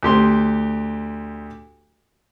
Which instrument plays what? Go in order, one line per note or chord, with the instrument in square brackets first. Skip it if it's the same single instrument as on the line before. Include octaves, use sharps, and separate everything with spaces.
[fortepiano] D2 G4 C6